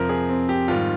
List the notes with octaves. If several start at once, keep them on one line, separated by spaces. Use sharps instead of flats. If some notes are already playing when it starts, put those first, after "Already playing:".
Already playing: F2 C3 F3 A#4
G#4
C4
G4
G#2 D#3 G3 F4